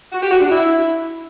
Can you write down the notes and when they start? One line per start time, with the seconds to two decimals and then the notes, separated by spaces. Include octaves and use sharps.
0.12 F#4
0.22 G4
0.31 F#4
0.41 D4
0.50 E4